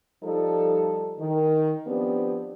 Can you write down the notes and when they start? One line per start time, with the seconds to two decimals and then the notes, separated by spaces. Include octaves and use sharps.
0.22 F3 G3 D#4 A4
1.18 D#3
1.86 F3 B3 C4 D4 G4